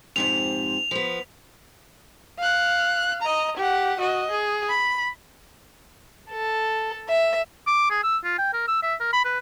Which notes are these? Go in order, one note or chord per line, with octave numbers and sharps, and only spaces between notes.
F2 G#2 C3 F7
F3 B3
F5 F#6
D#5 A#5
G4 F#5
F#4 D#5
G#4
B5
A4
E5
D6
G#4
E6
F4
G5
A#4
E6
E5
A#4
B5
B4